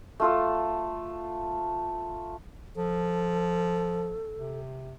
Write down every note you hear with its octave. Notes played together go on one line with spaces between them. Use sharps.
A3 F4 A4
F3 A4
C3